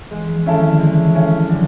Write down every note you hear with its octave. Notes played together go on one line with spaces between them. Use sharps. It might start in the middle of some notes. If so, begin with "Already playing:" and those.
E3 G#3
F3
D#3 C#4 E4 A4
D#3
D3
E3 G#3
F3 C#4 E4 A4
D3 F#3